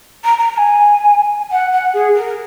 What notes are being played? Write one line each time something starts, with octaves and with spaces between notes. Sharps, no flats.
A#5
A#5
A#5
G#5
F#5
F#5
G#4
A#4